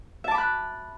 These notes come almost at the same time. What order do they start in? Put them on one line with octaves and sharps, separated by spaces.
E5 A5 D6 B5 F#6